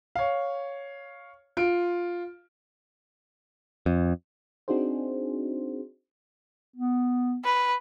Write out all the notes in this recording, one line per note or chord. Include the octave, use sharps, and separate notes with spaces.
C#5 F5
F4 D7
F2
C4 D4 D#4 F#4 G#4 C5
B3
B4